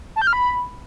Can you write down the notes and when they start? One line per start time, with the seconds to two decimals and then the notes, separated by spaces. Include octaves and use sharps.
0.16 A5
0.22 G6
0.27 F6
0.33 B5